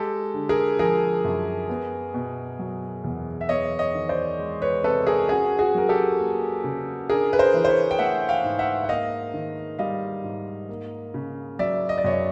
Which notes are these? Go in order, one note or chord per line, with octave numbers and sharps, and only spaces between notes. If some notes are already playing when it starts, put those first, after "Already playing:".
Already playing: G#3 G4 A4
D3
G#4 A#4
F3 G#4 A#4
F#2
B3
B2
F#3
E2
E5
B3 C#5 D#5
C#5 D#5
D#3
C5 D5
G#3
B4 C#5
C3 A4 B4
G#4 A#4
C#4 F#4 G#4
F#4 G#4
F#3 A#4
G4 A4
A#3
C#3
D4 G#4 A#4
B4
A#4 C5
E3
C5
B4 C#5
G5
A3 E5 F#5
F5 G5
G#2
E5 F#5
F#5
A#3 D#5 F5
D#3
G3 D#5 F5
G#2
A#3
C#3
F#3 D5 E5
D#5
D5
F#2 C#5 D#5